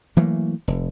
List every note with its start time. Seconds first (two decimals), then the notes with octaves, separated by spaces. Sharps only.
0.17 E3 F#3 A3 A#3
0.68 F1